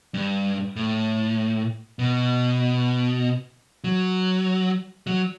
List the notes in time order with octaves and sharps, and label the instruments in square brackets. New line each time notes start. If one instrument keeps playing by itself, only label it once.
[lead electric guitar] G2
A2
B2
F#3
F#3